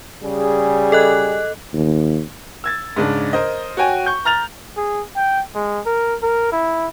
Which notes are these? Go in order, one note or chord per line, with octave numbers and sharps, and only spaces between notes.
C#3 G3 G#4
A4 D#5 F#6
D#2
E6 G#6 A6
G#2 C#3 D4
A#4 C5 D#5
F#4 C#5 G5 G#5
C#6 G6
A#5 F6 A6 F7
G#4
G5
G#3
A#4
A#4
E4